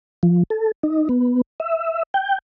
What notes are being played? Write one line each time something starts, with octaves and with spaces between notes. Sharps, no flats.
F3
A4
D#4
B3
E5
G5